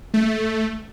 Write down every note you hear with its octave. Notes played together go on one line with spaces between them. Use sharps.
A3